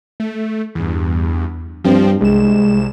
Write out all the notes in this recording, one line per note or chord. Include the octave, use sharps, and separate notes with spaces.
A3
E2 G2
G2 F3 C4
C2 G#3 E7